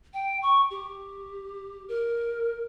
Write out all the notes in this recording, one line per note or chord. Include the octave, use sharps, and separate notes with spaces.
G5
C#6
G4
A#4